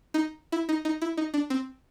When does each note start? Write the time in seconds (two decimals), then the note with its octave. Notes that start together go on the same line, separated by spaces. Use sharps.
0.14 D#4
0.52 E4
0.69 D#4
0.85 D#4
1.02 E4
1.17 D#4
1.34 D4
1.50 C4